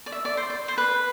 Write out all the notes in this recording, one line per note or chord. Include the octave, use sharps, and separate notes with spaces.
D5
E5
D5
C5
D5
C5
B4